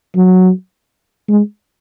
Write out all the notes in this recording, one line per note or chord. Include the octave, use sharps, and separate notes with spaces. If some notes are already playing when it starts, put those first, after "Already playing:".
F#3
G#3